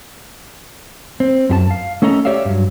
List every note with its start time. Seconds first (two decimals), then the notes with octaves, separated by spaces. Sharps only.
1.20 C4
1.50 F#2 G4 A5
1.71 F5
2.02 A3 C#4 A4 D#5 A#5
2.25 G4 C#5 D5 E5 F5
2.45 G2 F#3